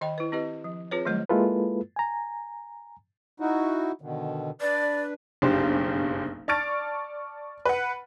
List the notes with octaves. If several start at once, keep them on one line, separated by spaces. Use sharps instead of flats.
D#3 D#5 G5 B5
E4 B4
C4 E4 G4 B4 D#5
F3
C4 F4 G#4 B4 C#5
D#3 F#3 G3 A3 C5 D#5
G#3 A#3 E4 F4 A4 B4
G#5 A#5
D#4 E4 F#4
B2 D3 D#3
D4 B4 D5
F#1 B1 G2 G4 C5
D5 A5 C#6 F6 A6 D7
B4 F#5